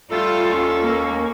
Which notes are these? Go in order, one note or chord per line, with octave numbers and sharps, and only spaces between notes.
G3 A3 F4 A4
D#2 C#4 C#6
A#3